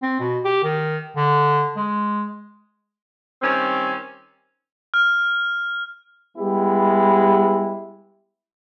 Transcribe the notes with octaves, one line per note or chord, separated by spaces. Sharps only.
C4
B2
G4
D#3
D3
G#3
D#3 G3 C4 C#4
F6
G3 G#3 B3 E4 G4